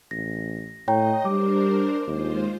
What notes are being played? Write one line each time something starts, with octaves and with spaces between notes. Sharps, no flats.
A1 A#6
A2 C#5 D#5 G5 A#5
G3 D4 A#4 C5 D6
D#2 G#3 F4 C5